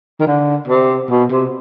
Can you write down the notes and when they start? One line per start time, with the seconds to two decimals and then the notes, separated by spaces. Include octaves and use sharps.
0.20 D#3
0.27 D3
0.68 C3
1.10 B2
1.31 C3